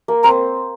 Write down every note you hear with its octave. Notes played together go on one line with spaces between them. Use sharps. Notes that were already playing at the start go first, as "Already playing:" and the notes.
A#3
C4 A#5